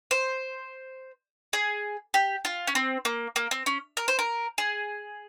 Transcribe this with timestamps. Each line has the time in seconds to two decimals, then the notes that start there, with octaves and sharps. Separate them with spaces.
0.11 C5
1.53 G#4
2.14 G4
2.45 F4
2.67 C#4
2.75 C4
3.05 A#3
3.36 A#3
3.51 C4
3.66 C#4
3.97 A#4
4.08 C5
4.19 A#4
4.58 G#4